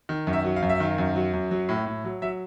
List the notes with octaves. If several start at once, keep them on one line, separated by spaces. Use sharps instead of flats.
D#3
F#2
E5
F#3
F5
F#2
E5
D#3 F5
F#2
F#3
F#2
F#3
A2
A2
F#3
F#3 E5